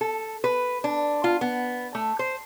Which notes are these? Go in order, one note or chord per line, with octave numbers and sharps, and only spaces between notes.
A4
B4
D4
F4
B3
A3
C5